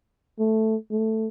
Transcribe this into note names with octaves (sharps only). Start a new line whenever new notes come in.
A3
A3